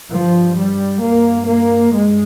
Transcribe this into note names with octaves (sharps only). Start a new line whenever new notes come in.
G2 F3
G3
G2 A#3
A#3
G2 G#3